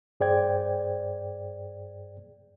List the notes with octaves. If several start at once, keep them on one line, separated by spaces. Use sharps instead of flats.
G2 G#4 C5 D5 G5 G#6